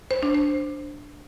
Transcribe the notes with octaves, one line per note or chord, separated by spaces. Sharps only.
C5
D4
C5